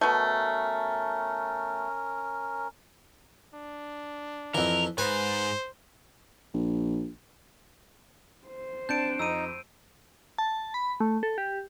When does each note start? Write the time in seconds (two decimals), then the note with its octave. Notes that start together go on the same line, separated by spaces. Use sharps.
0.01 B2 A3 C#4 A#4
3.54 D4
4.55 F2 E3 A#4
4.98 G#2 B4 C5 G#5
6.54 A#1
8.47 C5
8.89 C4 D4 A5 G6 C#7 D7 E7
9.19 F2 D#4 E6 D#7
10.38 A5
10.74 B5
11.00 A3
11.23 A4
11.38 G4